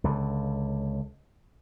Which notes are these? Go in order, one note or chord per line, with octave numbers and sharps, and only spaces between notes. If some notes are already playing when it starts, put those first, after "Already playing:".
C#2 D3